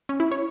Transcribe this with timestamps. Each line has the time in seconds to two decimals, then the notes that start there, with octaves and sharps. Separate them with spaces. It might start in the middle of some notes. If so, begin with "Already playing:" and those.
0.09 C#4
0.20 E4
0.32 C#5